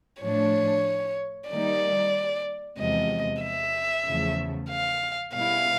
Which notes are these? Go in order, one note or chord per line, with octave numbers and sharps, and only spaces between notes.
A2 F3 A3 D4 C#5
D#3 G3 A#3 D#4 D5
E2 C3 F3 G#3 D#5
E5
E2 C#3 F3 A3
F5
B2 G3 B3 E4 F5